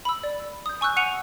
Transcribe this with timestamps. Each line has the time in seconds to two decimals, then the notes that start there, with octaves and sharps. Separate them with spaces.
0.05 B5 E6
0.23 D5
0.66 D#6 G6
0.81 G#5 C#6 E6 F#6 G6
0.97 F#5 C#6 F#6 C#7 D#7 F7